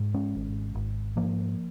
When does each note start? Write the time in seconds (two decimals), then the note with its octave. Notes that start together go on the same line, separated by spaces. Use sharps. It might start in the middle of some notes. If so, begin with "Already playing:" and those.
Already playing: G#2
0.14 G#3 C#4
0.35 G#1
0.75 G#1
1.16 G#2 F3 A#3